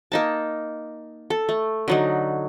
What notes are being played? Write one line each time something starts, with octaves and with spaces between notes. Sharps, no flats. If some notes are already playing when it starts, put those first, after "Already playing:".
A#3 D#4 A5
A4
A3
D3 F#3 D#4